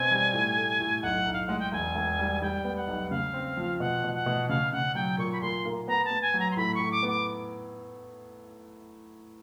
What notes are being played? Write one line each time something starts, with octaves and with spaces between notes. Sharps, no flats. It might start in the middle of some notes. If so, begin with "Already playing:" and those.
Already playing: B2 C4 G#5
G3
A2
A3
A2
B1 F#5
B1
F5
G#3 F#5
G5
E1 G#5
E1
G3
G3 G5
B3
F#5
B1
C#3 F5
C4
F3
B2 F#5
B2
F#5
B2
C#3 F5
C#3 F#5
F#3 G5
A#2 C#6
B5
A#2 C6
A#3
B3 A#5
A5
B3
G#5
F#3
A#5
C6
A2 B5
A2 C#6
D6
B3
D6